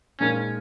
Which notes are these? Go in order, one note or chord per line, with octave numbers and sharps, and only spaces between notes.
A#2 F3 G#3 C#4 D#4 A#4